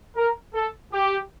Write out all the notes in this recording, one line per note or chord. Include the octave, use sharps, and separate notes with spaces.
A#4
A4
G4